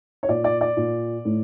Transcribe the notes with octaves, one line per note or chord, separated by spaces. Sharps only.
C#5
A#2 D5
D5
D5
A#2
A2